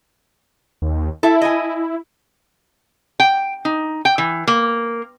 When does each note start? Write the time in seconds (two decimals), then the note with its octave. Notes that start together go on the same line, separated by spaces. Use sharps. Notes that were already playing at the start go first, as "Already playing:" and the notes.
0.82 D#2
1.23 E4 A4 E5
1.42 D#5 G#5
3.20 G5
3.65 D#4
4.05 G5
4.18 E3
4.48 A#3